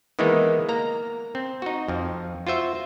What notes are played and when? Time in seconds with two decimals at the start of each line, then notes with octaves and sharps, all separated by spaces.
0.19 D#3 E3 G#3 A#3 B3 D#4
0.69 A#3 A#5
1.35 C4
1.62 D#4 F#4
1.88 F2 F3
2.47 F4 F#4 C5 E5